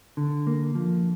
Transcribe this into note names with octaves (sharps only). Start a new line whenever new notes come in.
D3
A#3
F3